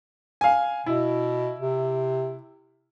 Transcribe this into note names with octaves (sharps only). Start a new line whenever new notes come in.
F5 G#5
B2 E4
C3